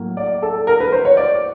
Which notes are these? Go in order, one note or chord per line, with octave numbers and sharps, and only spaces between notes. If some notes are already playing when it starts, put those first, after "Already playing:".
Already playing: A2 F#3 A#3
D5
A4
A#4
B4
C5
C#5
D5